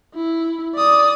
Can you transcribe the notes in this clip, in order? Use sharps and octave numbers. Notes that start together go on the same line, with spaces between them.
E4
D5 D#6